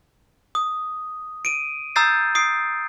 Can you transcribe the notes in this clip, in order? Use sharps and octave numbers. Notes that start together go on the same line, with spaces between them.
D#6
D7 D#7
A#5 D#6 E6 G6 A6 C7
D#6 C7 D7